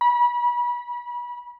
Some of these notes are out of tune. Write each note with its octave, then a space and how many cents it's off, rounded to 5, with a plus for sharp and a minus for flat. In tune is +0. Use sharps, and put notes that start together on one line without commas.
B5 -35